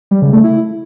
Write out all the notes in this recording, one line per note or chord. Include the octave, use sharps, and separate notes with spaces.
G3
C#3
A3
E4